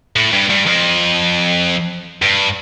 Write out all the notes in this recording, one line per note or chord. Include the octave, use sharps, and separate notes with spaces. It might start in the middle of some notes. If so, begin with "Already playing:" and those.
A2
G2
G2
F2
G2